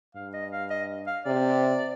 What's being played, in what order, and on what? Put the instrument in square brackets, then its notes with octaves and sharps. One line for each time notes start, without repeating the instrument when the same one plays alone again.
[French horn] G2 [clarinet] F5
[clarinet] D#5
F5
D#5
F5
[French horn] C3 [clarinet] D5